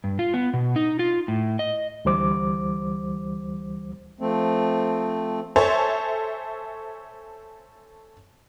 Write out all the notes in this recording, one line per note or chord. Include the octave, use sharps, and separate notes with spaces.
G2
F4
B3
B2
D#4
F4
A2
D#5
D2 E3 G3 C5 D6
F3 A3 C4
A4 C5 C#5 E5 G#5 A5